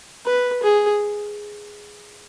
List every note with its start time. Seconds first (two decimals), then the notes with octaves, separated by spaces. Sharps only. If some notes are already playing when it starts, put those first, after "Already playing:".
0.26 B4
0.63 G#4